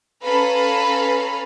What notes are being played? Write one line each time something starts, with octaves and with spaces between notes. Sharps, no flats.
C#4 A4 B4 F5 A#5 B5